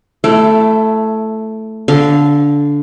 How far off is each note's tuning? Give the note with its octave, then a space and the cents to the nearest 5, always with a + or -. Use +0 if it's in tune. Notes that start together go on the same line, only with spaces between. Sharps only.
A3 +0 E4 +25
D3 -15 F5 +0